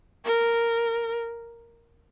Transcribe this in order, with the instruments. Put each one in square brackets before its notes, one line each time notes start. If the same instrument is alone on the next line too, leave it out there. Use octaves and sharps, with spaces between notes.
[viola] A#4